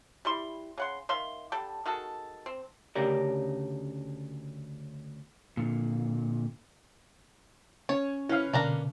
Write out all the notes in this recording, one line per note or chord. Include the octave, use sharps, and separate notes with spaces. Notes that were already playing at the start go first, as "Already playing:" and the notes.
G3 E4 C6
C#3 F#5 C6
D#3 E5 F5 C6
D3 G3 A4 G5
D#3 F#4 G#4 A4
C4
D2 C#3 C#4 G4 A#4 D5
A#2 D3
C#4 C#5
C#4 E4 B4 F5 F6
B2 D3 A#3 D4 A#5